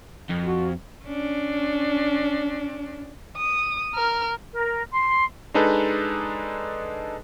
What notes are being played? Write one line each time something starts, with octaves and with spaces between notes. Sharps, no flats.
F2
F#4
C#4 D4
D#6
A#4 F6
A#4
C6
G#3 D4 D#4 G#4 A4 B4